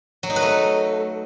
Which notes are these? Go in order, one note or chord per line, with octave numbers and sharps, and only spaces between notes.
F#3
D#4
B4
A3